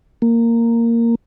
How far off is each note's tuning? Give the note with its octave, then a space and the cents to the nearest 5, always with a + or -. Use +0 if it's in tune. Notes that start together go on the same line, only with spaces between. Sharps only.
A#3 -10